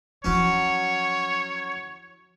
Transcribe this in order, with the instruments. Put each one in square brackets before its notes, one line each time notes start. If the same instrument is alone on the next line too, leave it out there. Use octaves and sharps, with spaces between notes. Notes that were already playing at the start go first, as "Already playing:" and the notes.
[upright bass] F3 E4 [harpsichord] F#3 C#4 [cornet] C#5